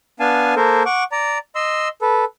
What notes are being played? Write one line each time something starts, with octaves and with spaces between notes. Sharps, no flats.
B3 D4 F5 G#5 A5
A#3 A4 A#4 C5
F#5 C#6 D6
D5 A#5
D#5 C6 E6
A4 B4